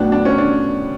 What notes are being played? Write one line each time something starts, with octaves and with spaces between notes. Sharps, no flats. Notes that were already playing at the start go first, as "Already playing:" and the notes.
Already playing: A2 F#3 B3 D4
D4
C#4
D4